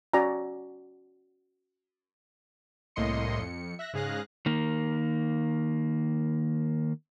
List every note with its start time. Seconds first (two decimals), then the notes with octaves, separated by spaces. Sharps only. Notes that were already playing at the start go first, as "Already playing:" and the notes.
0.14 C#4 F#4 D5 G#5 A#5
2.96 C2 A2 A#3 D#5 C6 C#7
3.39 F2 C#7
3.79 E5 F#6 A#6
3.93 G#2 C#3 G#4 F5 F#6 A#6
4.46 D#3 A#3